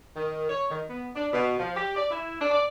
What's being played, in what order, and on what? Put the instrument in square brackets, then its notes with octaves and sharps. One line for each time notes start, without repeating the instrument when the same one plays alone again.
[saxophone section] D#3
C#5
D#3
B3
D4
B2
F3
G4
D5
E4
D4
D5